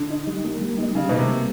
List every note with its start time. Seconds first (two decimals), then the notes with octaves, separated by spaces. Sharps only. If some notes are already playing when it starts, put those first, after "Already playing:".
Already playing: D3
0.10 D#4
0.27 G3
0.44 A#3
0.61 G3
0.78 D#4
0.95 C#3 G3
1.09 B2 A#3
1.18 C3
1.28 G3